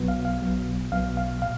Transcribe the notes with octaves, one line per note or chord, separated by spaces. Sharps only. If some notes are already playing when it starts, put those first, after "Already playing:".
Already playing: B1 B2 F#3 B3
F5
F5
B1 B2 F#3 B3
B1 B2 F#3 B3 F5
F5
A#2 F5